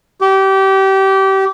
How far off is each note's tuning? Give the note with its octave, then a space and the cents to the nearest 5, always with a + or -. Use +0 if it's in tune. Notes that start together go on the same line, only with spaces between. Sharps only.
G4 -25